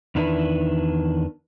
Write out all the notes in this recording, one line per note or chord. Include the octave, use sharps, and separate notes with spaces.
E2 D#3 D4 E4 B4